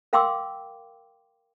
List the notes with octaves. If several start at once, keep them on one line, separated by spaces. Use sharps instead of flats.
A#4 F5 G5 C6 D6 E6